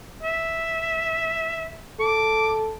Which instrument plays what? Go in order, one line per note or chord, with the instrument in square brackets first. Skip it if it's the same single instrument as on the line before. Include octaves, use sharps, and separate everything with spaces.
[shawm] E5
[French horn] A4 [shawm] D6